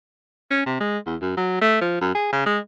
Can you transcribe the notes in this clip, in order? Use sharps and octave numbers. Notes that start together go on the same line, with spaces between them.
C#4
C3
G#3
E2
F#2
F#3
A3
F3
F#2
G#4
C#3
G#3